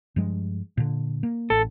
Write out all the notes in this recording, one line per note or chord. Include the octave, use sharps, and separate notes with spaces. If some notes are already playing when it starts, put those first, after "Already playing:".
G2 F3 G#3
A#2 D3
A#3
A1 A4